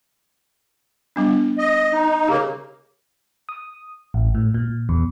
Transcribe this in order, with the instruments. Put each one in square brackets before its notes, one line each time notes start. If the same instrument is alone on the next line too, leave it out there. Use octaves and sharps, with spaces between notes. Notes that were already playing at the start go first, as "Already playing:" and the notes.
[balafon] G3 B3 D4
[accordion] D#5
D#4
[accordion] C#3 A#3 [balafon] G4
[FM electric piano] D#6
A1
A2
A#2
E2